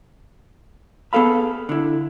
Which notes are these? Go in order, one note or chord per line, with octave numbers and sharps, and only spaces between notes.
B3 G#4 A4 F5 B5
D3 E4